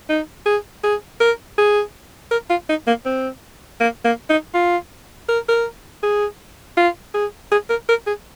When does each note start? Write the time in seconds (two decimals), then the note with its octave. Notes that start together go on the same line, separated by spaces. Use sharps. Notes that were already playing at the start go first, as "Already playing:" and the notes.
0.10 D#4
0.46 G#4
0.84 G#4
1.20 A#4
1.58 G#4
2.31 A#4
2.50 F4
2.69 D#4
2.88 A#3
3.06 C4
3.80 A#3
4.05 A#3
4.29 D#4
4.54 F4
5.29 A#4
5.49 A#4
6.03 G#4
6.77 F4
7.14 G#4
7.52 G#4
7.70 A#4
7.89 A#4
8.07 G#4